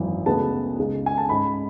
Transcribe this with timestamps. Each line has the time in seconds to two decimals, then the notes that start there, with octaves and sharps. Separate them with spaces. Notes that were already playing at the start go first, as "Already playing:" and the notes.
Already playing: G#1 F#2 E3
0.26 D2 C#3 G#3 B3 A5
0.78 C#2 C#3 G#3
1.06 G#5
1.18 A5
1.29 G#2 G#3 C#4 B5